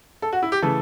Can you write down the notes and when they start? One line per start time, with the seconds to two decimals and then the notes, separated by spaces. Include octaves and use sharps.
0.22 A4
0.33 F#4
0.43 E4
0.52 G4
0.62 C#3 E3 A3 A4